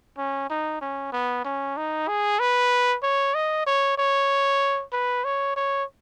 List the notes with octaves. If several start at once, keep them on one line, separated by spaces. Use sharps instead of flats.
C#4
D#4
C#4
B3
C#4
D#4
G#4
B4
C#5
D#5
C#5
C#5
B4
C#5
C#5